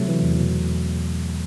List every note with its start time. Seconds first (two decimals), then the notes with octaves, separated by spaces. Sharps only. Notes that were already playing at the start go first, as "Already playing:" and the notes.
Already playing: C3 F#3 A3
0.08 E3
0.23 E2
0.38 B2
0.52 E2